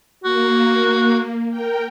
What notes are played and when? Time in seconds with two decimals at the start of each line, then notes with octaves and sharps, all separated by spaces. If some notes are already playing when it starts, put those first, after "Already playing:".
0.24 A#3 F#4
1.50 A#4 G5